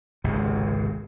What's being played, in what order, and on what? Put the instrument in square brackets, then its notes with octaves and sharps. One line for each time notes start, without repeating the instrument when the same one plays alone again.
[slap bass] G#1 C#2 C3